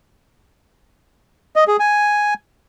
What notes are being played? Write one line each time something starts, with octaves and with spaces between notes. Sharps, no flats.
D#5
G#4
G#5